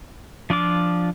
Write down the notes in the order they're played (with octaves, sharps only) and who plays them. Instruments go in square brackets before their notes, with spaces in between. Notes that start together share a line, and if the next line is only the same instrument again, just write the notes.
[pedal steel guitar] F3 D4 F4 D6